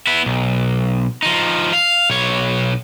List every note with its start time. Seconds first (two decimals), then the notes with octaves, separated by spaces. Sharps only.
0.07 B3 E4
0.26 B1
1.23 F3 D#4
1.73 F5
2.10 B1 C#5